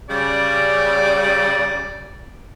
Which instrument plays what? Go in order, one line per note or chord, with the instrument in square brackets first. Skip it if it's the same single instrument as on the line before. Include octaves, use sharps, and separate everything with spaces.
[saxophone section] C#3 G3 [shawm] D5